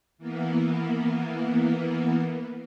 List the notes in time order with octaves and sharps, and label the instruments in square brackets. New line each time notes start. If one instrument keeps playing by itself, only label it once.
[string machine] E3 A#3 B3